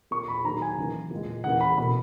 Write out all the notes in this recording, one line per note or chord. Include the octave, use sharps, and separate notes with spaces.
A#2 A#3 C#6
B5
D#3 F#3 A#3 A#5
G#5
C#3 E3 A#3
A#2 G#3
C#3 E3 A#3 F#5
B5
B2 A#3 B5